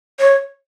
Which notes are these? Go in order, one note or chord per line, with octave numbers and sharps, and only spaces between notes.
C#5